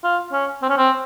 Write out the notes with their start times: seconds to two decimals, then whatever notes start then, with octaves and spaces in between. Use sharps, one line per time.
0.04 F4
0.32 C#4
0.62 C4
0.69 C#4
0.77 C4